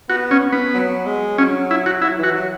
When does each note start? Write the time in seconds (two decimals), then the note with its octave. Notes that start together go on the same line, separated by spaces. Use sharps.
0.10 B3 F#4
0.31 C#4
0.52 B3
0.74 F#3
1.06 G#3
1.38 F#3 C#4
1.71 E4
1.86 F#4
2.02 F#3 E4
2.18 E3
2.24 F#4
2.34 F#3